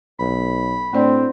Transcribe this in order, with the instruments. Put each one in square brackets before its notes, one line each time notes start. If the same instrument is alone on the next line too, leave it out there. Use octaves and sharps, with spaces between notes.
[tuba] B1 [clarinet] B5
[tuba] A2 [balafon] A3 D4 D5 [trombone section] C4